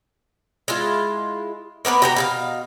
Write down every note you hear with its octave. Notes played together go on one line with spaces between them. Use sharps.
G#3 E4 F4
A#3 B3 A#4 B4
F#4 G4 A#5
B2 G#4 F5